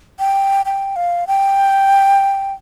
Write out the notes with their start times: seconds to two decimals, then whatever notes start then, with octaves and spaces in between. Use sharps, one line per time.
0.19 G5
0.66 G5
0.96 F5
1.27 G5